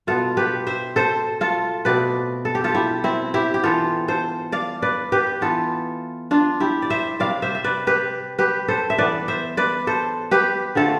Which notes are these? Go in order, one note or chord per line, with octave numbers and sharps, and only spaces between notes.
B2 B3 F4 A4
G4 B4
C5 E5
A4 C5
F4 A4
B2 A3 C4 B4 D5
A4
G4
F4 A4
E4 G4
C4 E4
E4 G4
G4
E3 B3 F4 A4
A4 C5
D5 F5
B4 D5
G4 B4
E3 B3 F4 A4
D4 F4
E4 G4
D5
C5 E5
C3 G3 C4 D5 F5
C5 E5
E5
B4 D5
G4 B4
G4 B4
A4 C5
E5
E3 B3 B4 D5
C5 E5
B4 D5
A4 C5
G4 B4
D3 A3 C4 F4 A4